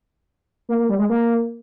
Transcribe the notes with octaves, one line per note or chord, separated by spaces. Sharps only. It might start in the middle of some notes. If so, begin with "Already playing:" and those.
A#3
A#3
G3
G#3
A#3